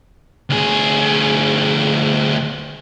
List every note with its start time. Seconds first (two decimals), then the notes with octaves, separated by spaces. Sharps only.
0.50 D2 G#4